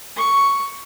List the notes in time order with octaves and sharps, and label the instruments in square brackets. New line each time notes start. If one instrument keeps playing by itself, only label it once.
[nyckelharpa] C#6